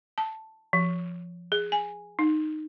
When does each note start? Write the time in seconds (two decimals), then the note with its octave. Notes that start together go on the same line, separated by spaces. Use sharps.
0.18 A5
0.73 F3
1.52 G#4
1.72 G#5
2.19 D#4